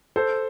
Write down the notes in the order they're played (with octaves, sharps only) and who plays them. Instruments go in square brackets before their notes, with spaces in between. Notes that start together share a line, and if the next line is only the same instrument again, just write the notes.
[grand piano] A4 C5